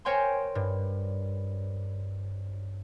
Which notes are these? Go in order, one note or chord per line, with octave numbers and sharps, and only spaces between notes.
A#4 C5 C#5 G5 G#5 C6
G2